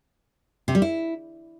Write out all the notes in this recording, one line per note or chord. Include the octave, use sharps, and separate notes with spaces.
C3
G3
E4